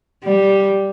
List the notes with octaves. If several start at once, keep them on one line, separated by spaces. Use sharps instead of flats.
G3